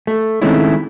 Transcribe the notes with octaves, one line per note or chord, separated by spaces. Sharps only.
A3
D#3 G#3 A3 C4 C#4 E4